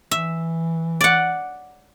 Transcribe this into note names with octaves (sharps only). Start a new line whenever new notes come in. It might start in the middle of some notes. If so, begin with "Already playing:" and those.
E3 E5
D5 F#5